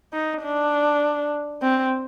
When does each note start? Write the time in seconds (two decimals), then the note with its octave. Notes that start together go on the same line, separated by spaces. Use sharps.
0.13 D#4
0.43 D4
1.62 C4